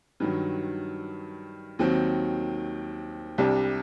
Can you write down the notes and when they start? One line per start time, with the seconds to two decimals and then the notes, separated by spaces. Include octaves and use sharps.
0.20 G2 D#3 F#3
1.79 D#2 D#3 F#3 C4
3.38 C2 C3 G3 D4